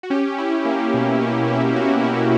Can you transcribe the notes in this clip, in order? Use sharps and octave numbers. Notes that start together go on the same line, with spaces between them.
F#4
C#4 G4
E4
A#3
B2
C#4
E4
A#3 F#4
B2